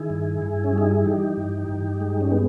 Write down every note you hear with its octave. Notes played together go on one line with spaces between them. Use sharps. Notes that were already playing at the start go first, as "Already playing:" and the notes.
Already playing: D#3 E4 G#4
G2
G2
C#4
G3
D#4
E4
E3 D#4 G4
G2
G2
G#3
C#4
G#3 B3